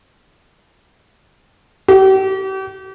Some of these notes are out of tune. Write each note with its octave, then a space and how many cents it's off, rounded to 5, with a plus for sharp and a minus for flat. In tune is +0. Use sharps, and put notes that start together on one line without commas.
G4 -40